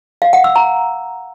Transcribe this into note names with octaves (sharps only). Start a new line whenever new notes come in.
F5
F#5
E6
A#5